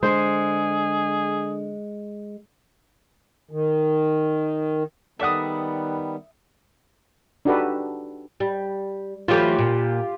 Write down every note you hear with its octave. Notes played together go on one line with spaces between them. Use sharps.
D3 G#3 G#4 C5
D#3
D#3 G3 B3 A4 D5 E5 F#5 D#6
D4 D#4 F#4 G4 A4 B4
G3
E3 F#3 A3 F4 G4
A#2